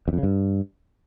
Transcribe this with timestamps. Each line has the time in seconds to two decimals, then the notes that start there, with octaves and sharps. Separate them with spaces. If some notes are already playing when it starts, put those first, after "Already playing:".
0.08 E2
0.13 F2
0.18 C#3
0.23 G2